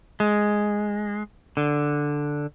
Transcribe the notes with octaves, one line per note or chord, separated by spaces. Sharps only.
G#3
D3